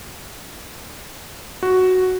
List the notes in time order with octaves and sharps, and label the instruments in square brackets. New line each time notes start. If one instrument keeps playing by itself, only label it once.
[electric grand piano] F#4